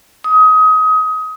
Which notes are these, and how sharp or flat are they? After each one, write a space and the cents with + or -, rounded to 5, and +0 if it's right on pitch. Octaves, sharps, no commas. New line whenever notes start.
D#6 +25